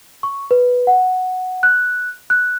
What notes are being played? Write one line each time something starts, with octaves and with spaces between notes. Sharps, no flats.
C#6
B4
F#5
F#6
F#6